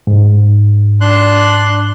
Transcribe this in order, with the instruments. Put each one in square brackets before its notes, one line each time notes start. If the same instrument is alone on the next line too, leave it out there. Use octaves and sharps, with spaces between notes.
[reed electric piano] G#2
[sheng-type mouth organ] D4 C6 F#6